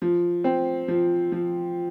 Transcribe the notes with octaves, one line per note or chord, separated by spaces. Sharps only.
F3
C4
F3
F3